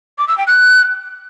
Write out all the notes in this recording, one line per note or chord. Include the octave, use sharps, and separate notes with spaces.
D6
E6
G5
F#6